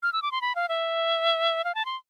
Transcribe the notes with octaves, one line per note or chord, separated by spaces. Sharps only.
F6
E6
D6
C6
B5
F5
E5
F5
A5
C6